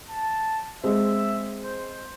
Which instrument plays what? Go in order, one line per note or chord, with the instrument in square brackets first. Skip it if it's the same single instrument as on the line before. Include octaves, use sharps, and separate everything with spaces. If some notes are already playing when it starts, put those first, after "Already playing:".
[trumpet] A5
[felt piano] G#3 C4 [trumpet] E5
[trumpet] C5